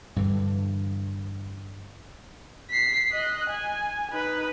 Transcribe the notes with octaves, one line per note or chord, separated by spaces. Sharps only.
G2 D3 E3
B6 C7
D#5 F#6
G#5
D#4 B4